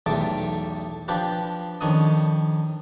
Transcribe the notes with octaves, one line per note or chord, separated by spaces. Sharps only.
B1 E2 G3 A3 A5 D6
F3 D4 F4 G4 B4
F2 D#3 C#4 D4 D#6